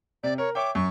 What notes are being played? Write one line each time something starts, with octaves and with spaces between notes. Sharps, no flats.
C3 D5
A#4 C#5
C#5 E5 G5 D6
F#2 C#6